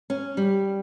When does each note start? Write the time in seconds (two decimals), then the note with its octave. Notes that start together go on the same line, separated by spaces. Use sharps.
0.10 C#4
0.37 G3